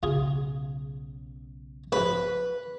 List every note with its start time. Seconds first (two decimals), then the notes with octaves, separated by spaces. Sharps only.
0.03 B1 C#3 F4 G#4
1.92 F2 G#2 B4